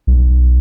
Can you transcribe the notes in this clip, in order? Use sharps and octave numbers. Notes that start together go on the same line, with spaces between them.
B1